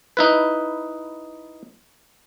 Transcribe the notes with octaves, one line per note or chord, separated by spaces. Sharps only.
D#4 E4 B4